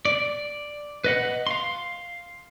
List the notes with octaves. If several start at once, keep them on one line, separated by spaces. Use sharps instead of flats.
D5
B4 D#5 F#5
F5 C6